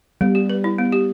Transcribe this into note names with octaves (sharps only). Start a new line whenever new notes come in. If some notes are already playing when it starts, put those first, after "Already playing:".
G3 B3
G4
B4
E4
B3
G4